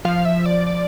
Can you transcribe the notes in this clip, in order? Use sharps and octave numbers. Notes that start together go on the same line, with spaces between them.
F3 F5
E5
D5
D5